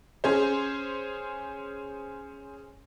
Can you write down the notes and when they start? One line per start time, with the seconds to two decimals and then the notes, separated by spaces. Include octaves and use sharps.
0.24 C#4 G#4 C5